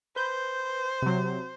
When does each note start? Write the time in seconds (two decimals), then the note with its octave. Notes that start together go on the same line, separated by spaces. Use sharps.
0.16 B4 C5 G6
1.02 C3 F#3